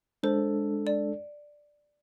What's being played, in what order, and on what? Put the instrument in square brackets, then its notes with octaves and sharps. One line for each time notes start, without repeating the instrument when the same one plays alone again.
[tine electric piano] G#3 D4 A4 [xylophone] C5
[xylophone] D5